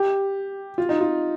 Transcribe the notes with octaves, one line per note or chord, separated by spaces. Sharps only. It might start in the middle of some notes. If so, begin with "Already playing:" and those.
Already playing: G4
F4
D#4
F4